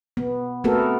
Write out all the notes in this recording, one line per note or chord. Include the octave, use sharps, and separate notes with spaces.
B3
A3 B3 C4 F#4 A4 A#4